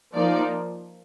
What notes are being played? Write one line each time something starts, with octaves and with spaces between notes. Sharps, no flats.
F3 A#3 D#4 D5